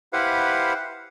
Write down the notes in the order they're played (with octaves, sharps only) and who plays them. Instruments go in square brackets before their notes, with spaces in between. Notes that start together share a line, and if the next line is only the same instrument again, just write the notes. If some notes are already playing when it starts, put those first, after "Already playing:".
[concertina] E4 G4 B4 C5 F5 F#5